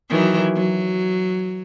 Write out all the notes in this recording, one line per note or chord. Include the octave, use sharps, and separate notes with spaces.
D#3 E3 F#3
F#3